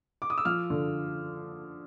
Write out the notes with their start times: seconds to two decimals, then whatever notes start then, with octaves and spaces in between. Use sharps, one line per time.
0.22 D6
0.30 D#6
0.38 E6
0.45 F3 F6
0.70 D3